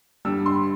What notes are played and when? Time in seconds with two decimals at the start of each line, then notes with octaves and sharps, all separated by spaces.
0.25 G2 D3 G3 E6
0.46 C6